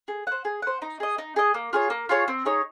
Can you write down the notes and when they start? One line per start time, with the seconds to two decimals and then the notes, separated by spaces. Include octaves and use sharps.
0.08 G#4
0.27 C5 F#5
0.45 G#4
0.62 C5 F#5
0.82 D#4
1.00 G#4 D#5
1.18 D#4
1.36 G#4 D#5
1.54 A#3
1.73 F4 G#4 C#5
1.90 A#3
2.09 F4 G#4 C#5
2.28 C4
2.45 D#4 G#4 C#5